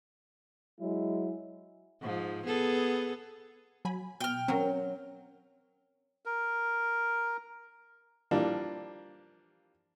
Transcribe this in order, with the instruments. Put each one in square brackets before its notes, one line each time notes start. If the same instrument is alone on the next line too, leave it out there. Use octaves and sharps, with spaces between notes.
[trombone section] F#3 G#3 E4
[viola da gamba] G#2 F3
B3 G#4 A4
[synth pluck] F#3 G#5 B5
[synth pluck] B2 [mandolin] G5 F6
[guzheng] F#3 [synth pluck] C4 C#4 A#4
[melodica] A#4
[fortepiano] E3 F3 G3 A#3 D4